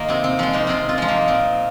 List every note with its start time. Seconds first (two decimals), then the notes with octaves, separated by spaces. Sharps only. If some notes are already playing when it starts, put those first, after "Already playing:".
Already playing: D#3 A#3 D#4 F4
0.08 C3 C4
0.24 C4
0.39 F3 G#3 C4
0.53 A#3 D#4
0.67 C3 C4 F4
0.89 C4 F4
0.98 F3 G#3
1.08 A#3 D#4
1.28 A#2 C4